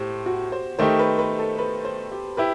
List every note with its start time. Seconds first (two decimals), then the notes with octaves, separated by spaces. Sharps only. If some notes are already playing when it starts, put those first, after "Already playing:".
Already playing: A2 G4 C5
0.26 F#4
0.52 C5
0.79 D#3 A3 D#4 G4 C5
0.99 B4
1.19 B4
1.39 A4
1.58 B4
1.85 C5
2.11 G4
2.37 E4 G4 B4